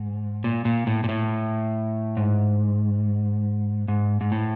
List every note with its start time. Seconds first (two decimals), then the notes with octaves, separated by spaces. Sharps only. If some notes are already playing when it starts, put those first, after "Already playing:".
Already playing: G#2
0.44 A#2
0.65 A#2
0.87 A2
1.04 A#2
1.09 A2
2.17 G#2
3.88 G#2
4.21 G#2
4.32 A2